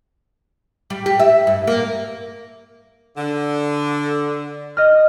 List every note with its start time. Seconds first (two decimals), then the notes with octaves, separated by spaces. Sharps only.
0.90 G3
1.06 G4
1.19 E5
1.47 G2
1.67 A#3
3.17 D3
4.77 D#5 F6